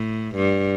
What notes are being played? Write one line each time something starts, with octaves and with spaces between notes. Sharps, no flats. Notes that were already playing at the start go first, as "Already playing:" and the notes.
Already playing: A2
G2